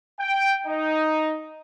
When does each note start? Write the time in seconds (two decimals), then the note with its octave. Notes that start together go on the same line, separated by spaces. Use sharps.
0.20 G5
0.65 D#4